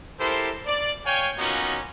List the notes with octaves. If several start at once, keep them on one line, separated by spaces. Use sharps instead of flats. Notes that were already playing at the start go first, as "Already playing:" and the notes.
E4 G4 A4 A#4 C5
D5
C#5 F5 G5 G#5
A#3 B3 C#4 D#4 F4 F#4